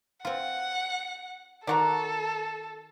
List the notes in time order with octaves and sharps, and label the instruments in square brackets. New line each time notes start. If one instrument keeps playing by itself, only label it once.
[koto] C4 F4 [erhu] F#5
[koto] D#3 F#4 [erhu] A4 [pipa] D5 F#5 A#5